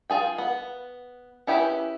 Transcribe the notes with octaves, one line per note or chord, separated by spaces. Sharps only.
F4 G#4 G5
B3
C#4 E4 G4 G#4 B4